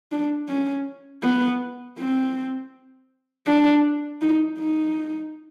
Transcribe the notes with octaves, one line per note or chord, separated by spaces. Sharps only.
D4
C#4
B3
C4
D4
D#4
D#4